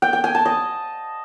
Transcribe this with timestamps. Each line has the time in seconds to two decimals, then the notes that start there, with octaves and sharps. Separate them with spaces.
0.02 G5
0.13 G5
0.24 G#5
0.35 A5
0.45 D#5